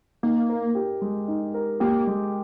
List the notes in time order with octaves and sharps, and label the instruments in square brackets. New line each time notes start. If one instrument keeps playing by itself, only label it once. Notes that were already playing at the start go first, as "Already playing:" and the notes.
[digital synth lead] A#3 [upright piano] D#4
[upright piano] A#4
G4
G#3
D#4
A#4
[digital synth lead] A#3 [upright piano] G4
[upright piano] G#3